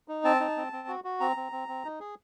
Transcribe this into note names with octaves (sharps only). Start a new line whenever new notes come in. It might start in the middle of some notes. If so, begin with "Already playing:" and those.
D#4
C4 A5
D#4
C4
C4
F#4
F#4
C4 A#5
C4
C4
C4
D#4
G#4